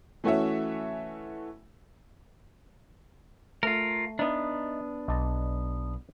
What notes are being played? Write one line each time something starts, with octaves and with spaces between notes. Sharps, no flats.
E3 A3 C#4 F#4 C#5 E5
A3 F4 A#4
B3 D4 D#4 E5
B1 D5 D#5 A5